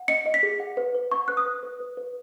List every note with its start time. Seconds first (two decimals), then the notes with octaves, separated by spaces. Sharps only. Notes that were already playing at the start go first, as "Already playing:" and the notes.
Already playing: F#5
0.08 D#5 C#7
0.26 D#5
0.34 B6
0.43 G#4
0.60 F#5
0.77 B4
0.94 B4
1.12 F#5 C#6
1.28 B4 F#6
1.37 D#6
1.46 B4
1.63 B4
1.80 B4
1.97 B4